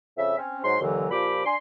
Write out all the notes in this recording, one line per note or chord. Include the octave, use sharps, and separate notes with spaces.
F2 C#3 E5
C4 C#4
G#2 F#3 C6
D#2 A#2 D3 E3 F#3
A#2 F3 G4 B5 D6
D4 G#5 C6